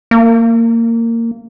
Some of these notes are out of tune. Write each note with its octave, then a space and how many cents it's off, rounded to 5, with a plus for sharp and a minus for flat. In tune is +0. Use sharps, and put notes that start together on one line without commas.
A#3 -20